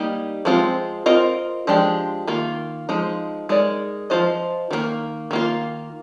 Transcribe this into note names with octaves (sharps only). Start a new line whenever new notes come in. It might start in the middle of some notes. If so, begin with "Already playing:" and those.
Already playing: G3 A#3 D#4 G4
F3 G#3 C4 F4
C4 F4 A#4 D#5
F3 G#3 D4 G4
D#3 A#3 F4
F3 G#3 D#4
G#3 D#4 A#4 D5
F3 C4 F4 C5 D#5
D#3 G3 A#3
D#3 A#3 F4